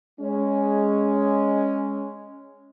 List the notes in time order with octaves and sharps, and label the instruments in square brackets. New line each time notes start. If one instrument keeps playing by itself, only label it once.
[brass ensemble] G#3 C#4